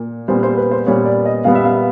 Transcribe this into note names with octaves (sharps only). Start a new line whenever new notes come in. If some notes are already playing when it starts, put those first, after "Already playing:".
Already playing: A#2
A#2 G3 B3 C5
C5
B4
C5
A#2 G3 B3 C#5
D5
D#5
A#2 G3 B3 F5
E5
F5